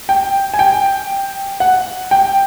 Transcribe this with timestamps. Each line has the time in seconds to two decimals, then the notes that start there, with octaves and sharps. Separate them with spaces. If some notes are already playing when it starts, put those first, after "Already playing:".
0.09 G5
0.54 G#5
0.59 G5
1.60 F#5
2.11 G5